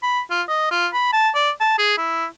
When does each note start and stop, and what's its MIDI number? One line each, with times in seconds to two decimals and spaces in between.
0.03 0.21 83
0.30 0.42 65
0.48 0.68 75
0.71 0.87 65
0.93 1.09 83
1.13 1.30 81
1.35 1.51 74
1.60 1.75 81
1.79 1.97 68
1.98 2.26 64